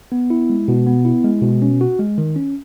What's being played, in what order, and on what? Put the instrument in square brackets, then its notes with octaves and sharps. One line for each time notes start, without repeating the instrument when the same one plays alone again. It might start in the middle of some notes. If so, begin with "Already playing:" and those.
[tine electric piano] B3
E4
G#3
B2
B3
E4
G#3
B2
C#4
F#4
G#3
D#3
C#4